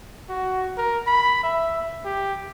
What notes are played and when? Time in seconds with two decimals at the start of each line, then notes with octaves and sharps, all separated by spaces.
0.29 F#4
0.78 A#4
1.07 B5
1.43 E5
2.05 G4